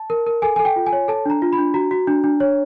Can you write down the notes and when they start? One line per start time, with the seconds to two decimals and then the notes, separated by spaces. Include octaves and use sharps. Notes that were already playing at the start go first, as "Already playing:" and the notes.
Already playing: A5
0.10 A#4
0.27 A#4
0.42 A4 G#5
0.56 G#5
0.59 A4
0.65 G5
0.76 F4
0.86 G#5
0.93 C#5
1.08 A4 A5
1.26 D4 A#5
1.42 F4
1.53 B5
1.58 D4
1.74 F#4 A#5
1.91 F#4
2.07 D4
2.24 D4
2.40 C#5